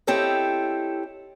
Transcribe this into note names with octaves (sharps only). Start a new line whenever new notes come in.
C4 E4 G4 A4 C#5 D#5